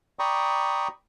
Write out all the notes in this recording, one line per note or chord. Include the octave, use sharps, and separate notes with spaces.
D5 G5 A#5 B5 C#6 D#6